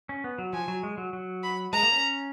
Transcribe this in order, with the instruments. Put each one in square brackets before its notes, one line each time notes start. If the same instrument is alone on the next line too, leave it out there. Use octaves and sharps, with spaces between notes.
[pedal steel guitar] C#4
B3
F#3
[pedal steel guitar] F3 [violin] G#5
[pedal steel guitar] F#3
G#3
F#3
F#3
[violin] B5
[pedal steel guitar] G#3 [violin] A#5
[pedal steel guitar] A#3
C#4